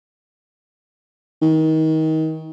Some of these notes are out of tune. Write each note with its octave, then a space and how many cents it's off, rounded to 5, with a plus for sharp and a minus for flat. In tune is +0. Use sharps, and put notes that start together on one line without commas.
D#3 +25